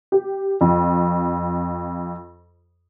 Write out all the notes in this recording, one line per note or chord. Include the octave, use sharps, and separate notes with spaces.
G4
F2